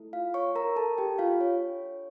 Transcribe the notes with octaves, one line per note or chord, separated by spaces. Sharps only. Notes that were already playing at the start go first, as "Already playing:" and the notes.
Already playing: A3 E4 A4
F4 F5
C#5 C#6
A#4 A#5
A4 A5
G4 G5
F4 F5
D4 A4 C#5